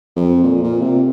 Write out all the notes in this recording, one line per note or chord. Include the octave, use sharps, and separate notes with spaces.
F2
A#2
A#2
C3